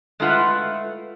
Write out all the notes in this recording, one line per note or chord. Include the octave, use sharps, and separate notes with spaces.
G#3 A3 E4 F4 B4 F#5